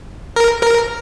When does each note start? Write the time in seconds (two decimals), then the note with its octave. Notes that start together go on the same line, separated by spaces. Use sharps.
0.36 A#4
0.63 A#4